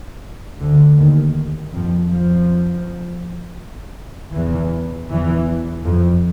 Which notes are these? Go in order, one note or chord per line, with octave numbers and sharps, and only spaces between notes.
D2 D3
D#2 D#3
F2 F3
F2 F3
E2 E3
E2 E3
F2 F3